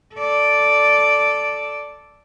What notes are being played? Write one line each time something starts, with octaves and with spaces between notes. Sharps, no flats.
A4 D5